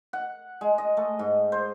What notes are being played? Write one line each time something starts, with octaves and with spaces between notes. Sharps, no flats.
F#5
G#3
D#5
A3
G#2
C5